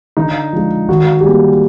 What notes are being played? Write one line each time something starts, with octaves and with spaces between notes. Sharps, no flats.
D3 D#4
F3 G#3
D#3 F#4
G4
G3 A#3 G#4